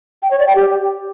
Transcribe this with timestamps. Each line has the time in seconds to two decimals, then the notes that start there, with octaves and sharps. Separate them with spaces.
0.23 G5
0.31 C#5
0.39 D5
0.47 G5
0.56 G4